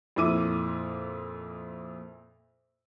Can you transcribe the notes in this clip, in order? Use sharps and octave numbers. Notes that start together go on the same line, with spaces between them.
F2 A#2 E4 D6 D#7